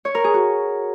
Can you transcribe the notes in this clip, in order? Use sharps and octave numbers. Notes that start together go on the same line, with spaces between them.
C#5
A#4
G#4
F#4